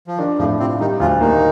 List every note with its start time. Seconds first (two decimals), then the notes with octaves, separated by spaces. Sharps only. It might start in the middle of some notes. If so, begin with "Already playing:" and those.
0.07 F3
0.18 D#3 D4
0.38 F2 A2 F3
0.59 C3 C4 F4
0.80 D#3 G3 D#4
1.00 D2 F3 F4
1.20 D#3 A#3 D#4